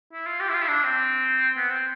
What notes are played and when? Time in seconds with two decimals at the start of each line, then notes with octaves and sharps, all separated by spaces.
0.13 E4
0.27 F4
0.40 G4
0.49 E4
0.54 F4
0.62 E4
0.68 D4
0.84 C4
1.57 B3
1.70 C4